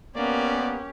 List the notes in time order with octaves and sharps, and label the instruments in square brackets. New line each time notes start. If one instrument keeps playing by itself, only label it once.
[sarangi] A#3 [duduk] B3 [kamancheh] C#4 G4 [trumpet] D5